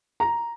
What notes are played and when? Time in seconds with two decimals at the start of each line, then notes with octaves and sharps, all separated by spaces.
0.20 A#5